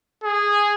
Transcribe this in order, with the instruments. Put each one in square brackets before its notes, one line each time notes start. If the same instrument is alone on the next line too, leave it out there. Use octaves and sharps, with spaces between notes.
[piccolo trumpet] G#4